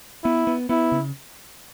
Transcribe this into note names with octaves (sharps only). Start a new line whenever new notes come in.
B3 E4
B3
B3 E4
C#3